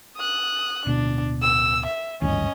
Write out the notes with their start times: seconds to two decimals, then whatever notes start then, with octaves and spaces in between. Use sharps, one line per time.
0.17 D#6 F#6
0.86 D1 B2 D4
1.42 E6
1.87 E5
2.21 G#1 D2 G2 C#4 D#5